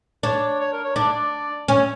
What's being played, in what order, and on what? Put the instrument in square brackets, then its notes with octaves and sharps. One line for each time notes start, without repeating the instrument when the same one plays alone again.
[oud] D4 [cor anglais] C#5
[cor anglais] C#5
A#4
C#5
[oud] D4 [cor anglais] D5
[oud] C#4 [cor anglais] C#5